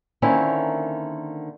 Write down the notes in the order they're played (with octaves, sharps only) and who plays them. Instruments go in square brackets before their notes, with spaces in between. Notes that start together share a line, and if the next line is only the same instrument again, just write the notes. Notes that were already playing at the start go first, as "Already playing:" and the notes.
[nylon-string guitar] D3 D#3 A#3 C4 C#4 E4